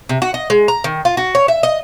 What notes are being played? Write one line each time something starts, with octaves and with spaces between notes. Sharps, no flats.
C3
F#4
D#5
G#3
A#5
D#3
F4
F#4
C#5
E5
D#5